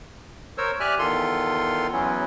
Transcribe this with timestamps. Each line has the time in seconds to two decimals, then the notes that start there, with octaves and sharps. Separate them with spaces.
0.58 A#4 C5 C#5 E6
0.80 G4 D5 E5 G#5 F6 F#6
0.99 E2 D#3 F4 A4 C6
1.93 E2 F#3 B3 C#4 E4